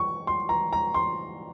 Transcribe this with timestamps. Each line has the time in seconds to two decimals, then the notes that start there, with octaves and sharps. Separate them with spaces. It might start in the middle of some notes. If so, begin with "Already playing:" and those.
Already playing: C#6
0.27 C6
0.49 A#5
0.73 A#5
0.94 C6